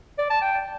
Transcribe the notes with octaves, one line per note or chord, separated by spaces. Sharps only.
D5
A5
G5